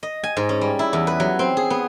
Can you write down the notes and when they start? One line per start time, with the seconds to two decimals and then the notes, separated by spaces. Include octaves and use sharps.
0.03 D#5
0.24 G#5
0.37 G#2
0.49 C#4
0.61 G3
0.79 E4
0.93 E2
1.07 B4
1.20 F#3
1.39 C4
1.57 G#4
1.70 B3